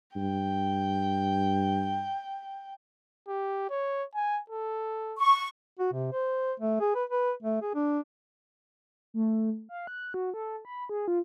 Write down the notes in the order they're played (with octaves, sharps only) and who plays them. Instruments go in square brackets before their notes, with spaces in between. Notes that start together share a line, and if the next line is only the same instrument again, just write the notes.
[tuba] G2 [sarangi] G5
[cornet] G4
C#5
G#5
A4
[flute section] C#6
[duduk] F#4
C3
C5
A3
G#4
B4
B4
A3
G#4
D4
[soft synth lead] A3
F5
F#6
F#4
A4
B5
G#4
F4